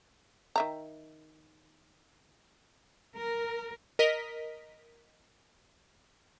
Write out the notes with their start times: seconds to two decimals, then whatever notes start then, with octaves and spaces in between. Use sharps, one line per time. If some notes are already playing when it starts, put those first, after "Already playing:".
0.56 D#3 E5 A#5
3.16 A#4
3.99 A#4 D#5 B6